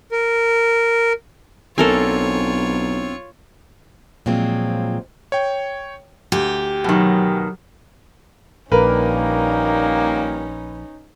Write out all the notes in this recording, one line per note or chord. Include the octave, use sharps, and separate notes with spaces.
A#4
B1 C4 D4 F4 A4 A#4 C#5 G#5
A#2 F3 F#3 G#3 C4
C#5 G5
D2 G4
B2 D#3 F#3
A#1 A#2 G3 A#3 C#4 D#4 A#4 B4